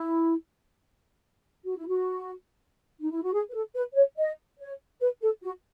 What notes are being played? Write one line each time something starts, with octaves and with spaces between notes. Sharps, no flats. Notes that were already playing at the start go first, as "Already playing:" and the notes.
Already playing: E4
F#4
E4
F#4
D#4
E4
F#4
G#4
B4
A4
B4
C#5
D#5
C#5
B4
A4
F#4